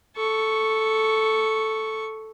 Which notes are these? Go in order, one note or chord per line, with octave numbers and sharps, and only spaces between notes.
A4 C#6